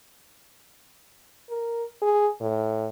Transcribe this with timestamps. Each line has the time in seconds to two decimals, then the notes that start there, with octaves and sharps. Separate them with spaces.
1.50 A#4
2.02 G#4
2.40 A2